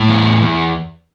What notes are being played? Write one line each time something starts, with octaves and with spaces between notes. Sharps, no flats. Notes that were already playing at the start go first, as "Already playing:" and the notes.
Already playing: A2
E2
E2